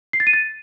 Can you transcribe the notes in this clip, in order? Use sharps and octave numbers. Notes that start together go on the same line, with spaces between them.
C7
A6
D#7
A6